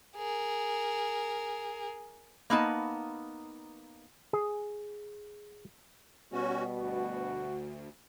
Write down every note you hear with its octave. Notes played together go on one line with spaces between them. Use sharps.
G#4 A#4
A#3 B3 D#4 A5
G#4
B2 G3 C#4 F#4
D2 F#4